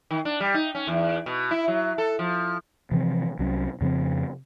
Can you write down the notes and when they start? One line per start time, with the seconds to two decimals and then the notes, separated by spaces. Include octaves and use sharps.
0.11 D#3
0.25 D4
0.40 G3
0.54 D#4
0.75 C#4
0.87 E2
1.26 B2
1.51 E4
1.68 F#3
1.98 A4
2.19 F3
2.91 C3 E3 F3 C4
3.39 C2 F#3 C#4
3.81 F2 C#3 F3 C4